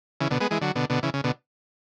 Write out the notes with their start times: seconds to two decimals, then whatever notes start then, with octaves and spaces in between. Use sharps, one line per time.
0.21 C#3 E3
0.30 B2 D3
0.40 G#3 B3
0.51 E3 G#3
0.61 D3 F#3
0.75 B2 D3
0.90 B2 D3
1.03 C#3 E3
1.14 C#3
1.24 B2 D3